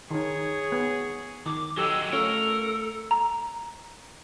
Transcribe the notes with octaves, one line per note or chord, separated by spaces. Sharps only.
D#3 D#4 G#4 C#5
B3
D#3 D6
F#3 G#3 G4 A4 E6
A3 C#4 F4 A4 A#4 C#5
A#5